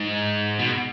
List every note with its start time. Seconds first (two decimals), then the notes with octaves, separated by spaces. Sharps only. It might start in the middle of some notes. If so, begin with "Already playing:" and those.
Already playing: G#2
0.59 B2